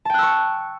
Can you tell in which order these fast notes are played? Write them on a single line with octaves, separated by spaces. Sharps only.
A5 G5 F#6 E6 C#6